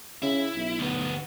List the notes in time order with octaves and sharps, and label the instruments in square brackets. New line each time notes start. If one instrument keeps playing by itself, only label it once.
[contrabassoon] C#3 [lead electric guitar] E4
[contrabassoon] B1
[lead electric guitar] D2 B3